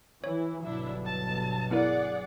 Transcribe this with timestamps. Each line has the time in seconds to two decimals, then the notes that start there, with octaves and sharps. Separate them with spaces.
0.24 E3 E4 C#5
0.64 G1 B2 F#3 D4 E4 E5
1.05 A5
1.71 B3 E4 G#4 A#4 D5 F#5